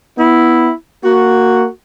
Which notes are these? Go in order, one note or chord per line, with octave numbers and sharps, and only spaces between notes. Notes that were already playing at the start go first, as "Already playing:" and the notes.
B3 E4
A#3 F#4